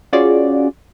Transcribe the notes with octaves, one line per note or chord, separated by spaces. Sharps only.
C#4 F4 F#4 G#4 D5